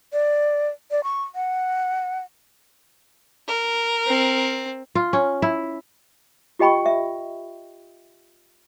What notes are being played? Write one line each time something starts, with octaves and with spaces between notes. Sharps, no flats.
D5
D5
C#6
F#5
A#4
C4
F4
C#4
E4
F4 G4 D#5 G5 B5 C#6
E5